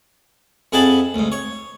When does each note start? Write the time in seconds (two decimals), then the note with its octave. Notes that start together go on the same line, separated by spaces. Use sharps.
0.72 F2 E4 G#4 F#5 A5 B5
1.14 D2 G#2
1.32 C#5